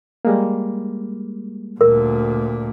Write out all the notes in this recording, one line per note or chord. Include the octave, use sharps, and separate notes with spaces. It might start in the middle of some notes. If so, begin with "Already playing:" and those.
G3 G#3 A#3
D2 A#2 A#4